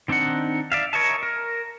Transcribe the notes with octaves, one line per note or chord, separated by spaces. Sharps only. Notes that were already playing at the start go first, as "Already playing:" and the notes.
D#3 C4 D4 D#4 F#5
D5 E5 F5
A#4 C#5 D#5 E5 A5
A#4